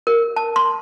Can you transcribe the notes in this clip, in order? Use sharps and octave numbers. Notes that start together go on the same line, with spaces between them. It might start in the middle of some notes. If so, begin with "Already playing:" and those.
A#4
A5
C6